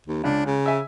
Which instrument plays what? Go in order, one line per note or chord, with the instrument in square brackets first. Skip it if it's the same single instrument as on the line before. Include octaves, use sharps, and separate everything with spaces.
[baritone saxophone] D#2
[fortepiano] C#2 [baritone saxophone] D4
[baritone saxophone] C#3
[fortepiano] E5 G#5